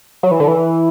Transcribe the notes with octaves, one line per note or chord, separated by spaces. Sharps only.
F#3
E3
D3
E3